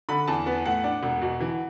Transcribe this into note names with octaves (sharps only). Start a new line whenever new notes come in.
D3 B5
E2 A5
B3
A2 F#5
D4
E1
B2
E3